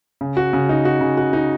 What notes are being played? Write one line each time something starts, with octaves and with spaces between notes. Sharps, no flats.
C#3
F#4
C#3
D#4
F#4
C#3
F#4
D#4